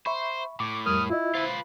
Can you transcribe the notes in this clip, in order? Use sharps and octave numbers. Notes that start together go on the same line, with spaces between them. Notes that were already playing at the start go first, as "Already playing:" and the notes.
C5 E5 B5 C#6
A2 D6
F2 G3 A#4 D#6 F6
E4 F4 D#5
F4 B4 C5